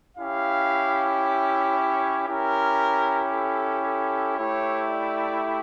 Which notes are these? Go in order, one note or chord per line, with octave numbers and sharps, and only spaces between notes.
C#4 E4 G4 F5
E5
C#5
C#4 E4 G4 A#4
A4
A4
A3 E4 G4 C#5
D5